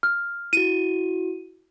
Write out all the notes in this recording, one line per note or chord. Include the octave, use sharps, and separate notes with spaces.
F6
E4 F#4 D#7